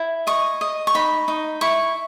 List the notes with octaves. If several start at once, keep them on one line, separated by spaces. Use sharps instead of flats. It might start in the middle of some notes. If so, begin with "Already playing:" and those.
Already playing: E4
D#5 C#6
D#5
C#6
D#4 B5
D#4
E4 C#6